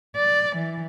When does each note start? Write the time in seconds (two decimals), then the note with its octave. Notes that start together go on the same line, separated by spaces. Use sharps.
0.16 D5
0.56 E3